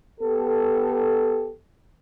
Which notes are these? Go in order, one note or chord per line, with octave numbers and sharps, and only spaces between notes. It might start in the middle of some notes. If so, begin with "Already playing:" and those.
B3 G4 A4